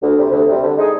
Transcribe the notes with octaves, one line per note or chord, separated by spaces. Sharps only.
D2
C3 G3
D2
C3 G3
D3
G#3 D#4 G#4